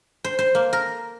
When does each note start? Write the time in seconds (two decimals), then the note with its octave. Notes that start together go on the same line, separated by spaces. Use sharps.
0.24 C5
0.39 C5
0.55 A#3
0.73 A#4